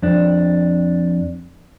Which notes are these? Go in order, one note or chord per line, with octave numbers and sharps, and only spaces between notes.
F2 D4